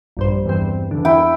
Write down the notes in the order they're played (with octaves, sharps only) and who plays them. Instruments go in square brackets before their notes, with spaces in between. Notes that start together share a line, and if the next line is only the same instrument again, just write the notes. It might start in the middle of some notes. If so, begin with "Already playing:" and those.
[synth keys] A#1 G2 C5
E2 G2 C4
E2 D3
[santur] E4 G5